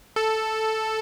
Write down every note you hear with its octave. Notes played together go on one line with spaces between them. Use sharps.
A4